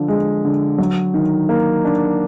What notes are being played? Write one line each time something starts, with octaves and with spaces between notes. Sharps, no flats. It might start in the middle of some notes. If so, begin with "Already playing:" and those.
Already playing: D3 F3
G#3
D3
F#3
D#3
A#3
D4